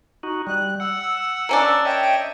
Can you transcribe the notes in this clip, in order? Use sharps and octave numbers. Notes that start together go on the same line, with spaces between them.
D#4 F#4
G3 F#6
F#5 E6
A#3 C#4 D4
C#5 D#5 E5 G5